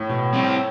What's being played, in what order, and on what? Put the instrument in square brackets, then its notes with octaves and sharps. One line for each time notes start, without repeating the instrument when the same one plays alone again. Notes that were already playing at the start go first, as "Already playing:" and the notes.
Already playing: [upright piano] A2
[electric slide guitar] B2
G3 C4 E4